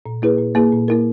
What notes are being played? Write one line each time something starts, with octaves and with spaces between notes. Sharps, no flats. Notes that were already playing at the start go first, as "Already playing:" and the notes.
A#2
A#3 E4 G#4 B4
A#2
A#3 E4 G#4 B4
A#2
A#3 E4 A#4